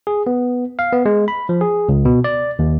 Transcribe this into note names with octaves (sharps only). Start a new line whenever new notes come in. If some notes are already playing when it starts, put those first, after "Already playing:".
G#4
B3
F5
B3
G#3
B5
F3
G#4
C#2
B2
D5
D#2